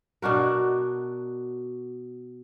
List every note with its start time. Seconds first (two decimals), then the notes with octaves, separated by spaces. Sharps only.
0.22 B2 D4 F#4 A#4